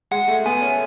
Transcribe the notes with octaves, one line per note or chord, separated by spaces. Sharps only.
G#3 F#5
A3
B3 G#5
C#4